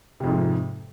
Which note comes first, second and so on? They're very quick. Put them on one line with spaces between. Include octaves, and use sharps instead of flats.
C3 F2 G#2 F3